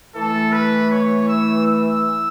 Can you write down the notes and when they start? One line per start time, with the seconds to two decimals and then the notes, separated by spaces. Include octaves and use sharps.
0.14 E3 A3 A4
0.52 B4
0.91 C#5
1.28 E6
1.66 E6